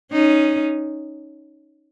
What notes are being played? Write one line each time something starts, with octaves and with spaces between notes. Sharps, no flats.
C#4 D#4